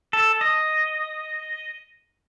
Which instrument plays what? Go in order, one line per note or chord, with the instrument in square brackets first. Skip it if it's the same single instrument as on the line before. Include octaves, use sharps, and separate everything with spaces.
[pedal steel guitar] A4
D#5